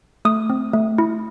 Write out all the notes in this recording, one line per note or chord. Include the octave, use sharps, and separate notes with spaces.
A3 D#6
C4
A3
E4